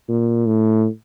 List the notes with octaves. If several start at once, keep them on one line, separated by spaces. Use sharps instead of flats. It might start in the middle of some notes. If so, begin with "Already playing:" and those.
A#2
A2